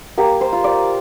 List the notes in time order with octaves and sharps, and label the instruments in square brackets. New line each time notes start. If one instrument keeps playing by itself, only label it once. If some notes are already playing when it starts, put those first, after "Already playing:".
[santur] A#3 G4
C5
F4
D5